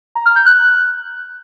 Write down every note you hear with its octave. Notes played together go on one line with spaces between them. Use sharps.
A#5
F6
G6
F#6